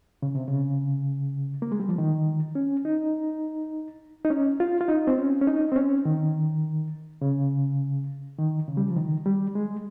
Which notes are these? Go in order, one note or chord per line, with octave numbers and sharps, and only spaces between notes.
C#3
C3
C#3
A#3
G#3
G3
F3
D#3
C#4
D#4
D#4
C#4
F4
F4
D#4
C4
C#4
C#4
D#4
C4
C#4
D#3
C#3
D#3
C#3
G3
F3
D#3
G3
G#3